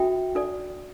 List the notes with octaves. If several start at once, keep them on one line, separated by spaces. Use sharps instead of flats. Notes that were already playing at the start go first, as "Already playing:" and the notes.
Already playing: D4 F#4 A4 E5 G5
D4 A4 D5